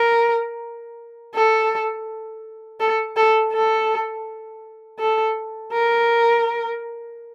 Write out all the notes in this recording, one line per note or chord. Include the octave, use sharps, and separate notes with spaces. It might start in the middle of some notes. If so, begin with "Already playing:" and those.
Already playing: A#4
A4
A4
A4
A4
A4
A#4